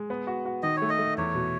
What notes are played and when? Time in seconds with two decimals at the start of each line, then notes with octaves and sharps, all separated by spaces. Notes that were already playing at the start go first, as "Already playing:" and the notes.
Already playing: G#3
0.10 B3
0.27 F#4
0.45 F#4
0.63 D#3 D#5
0.77 C#5
0.82 A3
0.90 D#5
0.99 A3
1.18 E2 C#5
1.35 B2